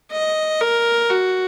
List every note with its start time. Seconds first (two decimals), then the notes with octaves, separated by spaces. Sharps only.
0.12 D#5
0.61 A#4
1.10 F#4